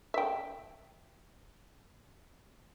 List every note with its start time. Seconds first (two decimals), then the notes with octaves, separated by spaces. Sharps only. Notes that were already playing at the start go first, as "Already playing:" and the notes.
0.14 E5 G5